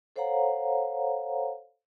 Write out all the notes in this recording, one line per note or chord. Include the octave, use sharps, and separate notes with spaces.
A4 C5 C#5 F5 F#5 A#5